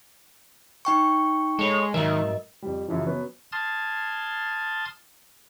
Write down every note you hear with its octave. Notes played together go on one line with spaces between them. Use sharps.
D#4 G5 C#6
G#3 A4 C#5
G#2 D#3 F#3 A#4 D#5 E5
F2 G3
F#2 C#3 E3 F3
F#3 B3 C#4
A5 C6 D#6 F6 G#6 A6